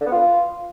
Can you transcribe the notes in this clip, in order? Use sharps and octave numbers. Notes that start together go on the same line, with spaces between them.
D3
B3
F4